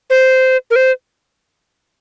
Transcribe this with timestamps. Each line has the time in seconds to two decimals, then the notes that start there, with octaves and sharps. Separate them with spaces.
0.10 C5
0.71 A#4
0.76 C5